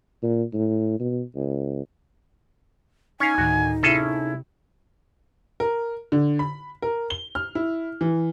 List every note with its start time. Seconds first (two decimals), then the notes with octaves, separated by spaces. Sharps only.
0.23 A#2
0.53 A2
1.00 B2
1.36 C#2
3.20 C#4 D#4 F5 G#5 C#6
3.38 D2 A2 D#3 F#4
3.83 C3 C#4 E4 G#4 A4
5.60 A#4
6.12 D3
6.39 B5
6.82 A#4
7.10 G7
7.35 F6
7.55 E4
8.01 E3